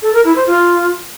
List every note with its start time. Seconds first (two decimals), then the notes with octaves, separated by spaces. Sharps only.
0.02 A4
0.13 A#4
0.25 E4
0.36 C5
0.47 F4